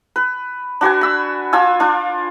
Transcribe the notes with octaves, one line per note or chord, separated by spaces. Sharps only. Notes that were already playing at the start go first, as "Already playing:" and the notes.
B4
D4 F#4 B4 G#5
B5 E6
D4 F4 G#5 E6
D4 F4